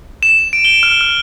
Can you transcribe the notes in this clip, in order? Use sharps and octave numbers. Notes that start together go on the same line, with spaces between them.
E7
D7
G7
F6
F6